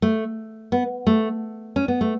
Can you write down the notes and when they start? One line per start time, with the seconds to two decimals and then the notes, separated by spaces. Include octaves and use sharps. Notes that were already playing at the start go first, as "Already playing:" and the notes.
0.02 A3
0.72 B3
1.07 A3
1.76 C#4
1.88 B3
2.01 A3